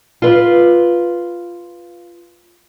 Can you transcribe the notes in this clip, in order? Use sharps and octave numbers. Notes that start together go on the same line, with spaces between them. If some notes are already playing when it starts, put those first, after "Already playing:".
F4 B4